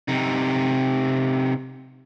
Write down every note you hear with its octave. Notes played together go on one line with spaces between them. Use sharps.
C3 D#4